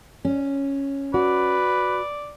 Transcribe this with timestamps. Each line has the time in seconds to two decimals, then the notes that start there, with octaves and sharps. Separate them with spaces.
0.25 C#4
1.14 F#4 B4 D5